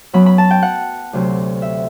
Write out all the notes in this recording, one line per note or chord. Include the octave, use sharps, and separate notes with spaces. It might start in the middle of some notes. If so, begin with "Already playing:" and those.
F#2 F#3 B3 B5
B5
A5
G5
F#5
D2 C3 F#3 C4
E5